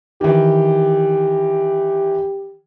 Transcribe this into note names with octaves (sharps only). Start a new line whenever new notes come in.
D#3 E3 G4